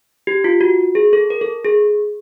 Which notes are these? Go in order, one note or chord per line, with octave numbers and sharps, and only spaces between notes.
G4
F4
F#4
G#4
A4
A#4
A4
G#4